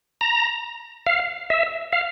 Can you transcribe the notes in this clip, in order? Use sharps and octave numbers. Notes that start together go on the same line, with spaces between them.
A#5
F5
E5
F5